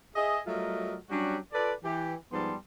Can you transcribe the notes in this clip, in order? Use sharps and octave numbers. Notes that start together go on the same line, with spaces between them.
G#4 D#5 E5
F#3 G3 A3 F4 A#4 D#5
F#3 G3 C#4 D4 F#4 G4
F4 A4 B4 D5
E3 G4
G#2 F3 G3 B3 A5 C6